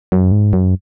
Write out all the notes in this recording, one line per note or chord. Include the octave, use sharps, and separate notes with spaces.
F#2
G#2
F#2